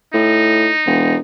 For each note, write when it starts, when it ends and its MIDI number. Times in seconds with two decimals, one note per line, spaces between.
0.14 0.69 45
0.14 1.19 63
0.86 1.17 28